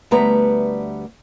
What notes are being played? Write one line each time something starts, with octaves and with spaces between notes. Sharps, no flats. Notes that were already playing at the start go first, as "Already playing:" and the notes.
D2 G3 A3 B3 B4 A#5